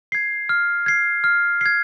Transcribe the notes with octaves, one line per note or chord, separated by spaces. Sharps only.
G#6 C7
F6
G#6 C7
F6
G#6 C7